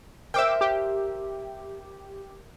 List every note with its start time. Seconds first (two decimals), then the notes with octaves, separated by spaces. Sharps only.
0.34 A#4 C5 E5 G5 D6 E6
0.61 G4